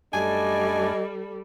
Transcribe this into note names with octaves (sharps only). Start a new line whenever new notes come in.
F#2 G3 A3 D4 A4 D#5 G#5